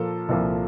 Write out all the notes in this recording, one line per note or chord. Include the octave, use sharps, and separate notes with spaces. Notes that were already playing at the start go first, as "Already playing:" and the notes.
Already playing: A#2 F3 A#3 A4
C2 A#2 F3 A#3